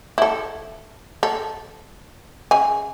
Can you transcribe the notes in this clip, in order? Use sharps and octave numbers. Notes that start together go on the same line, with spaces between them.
E4 A4
A4
C#3 G#5